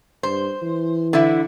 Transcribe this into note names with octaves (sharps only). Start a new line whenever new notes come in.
G2 C5
E3
D3 E4